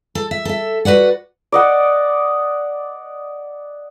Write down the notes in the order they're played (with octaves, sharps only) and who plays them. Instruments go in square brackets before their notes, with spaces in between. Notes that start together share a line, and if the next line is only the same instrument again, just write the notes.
[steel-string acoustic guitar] A4
E5
A4 E5
F#4 G4 B4 D5 F#5
[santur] D5 D#5 F#5